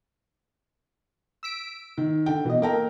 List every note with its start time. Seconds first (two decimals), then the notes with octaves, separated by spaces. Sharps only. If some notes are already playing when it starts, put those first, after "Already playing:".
1.43 E6 B6 D7
1.98 D#3
2.26 D3 G5
2.45 B2 E3 D#5
2.62 A#3 A4 A#4 G5 A#5